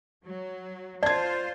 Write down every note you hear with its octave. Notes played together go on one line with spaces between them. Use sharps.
F#3
F4 C5 D5 A5 G#6